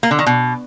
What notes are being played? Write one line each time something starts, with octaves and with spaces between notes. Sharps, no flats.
A#3
D3
D#3
B2